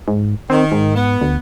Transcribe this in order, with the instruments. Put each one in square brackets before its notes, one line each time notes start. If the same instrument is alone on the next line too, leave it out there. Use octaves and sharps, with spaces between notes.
[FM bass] G#2
[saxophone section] D#3 [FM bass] C4
[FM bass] G#2
[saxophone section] B3
[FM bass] D2